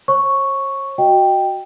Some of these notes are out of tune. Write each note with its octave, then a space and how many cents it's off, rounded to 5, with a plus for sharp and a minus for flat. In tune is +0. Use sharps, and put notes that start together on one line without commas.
C#5 -45 C#6 +0
F#4 +0 D#5 +0 G5 +0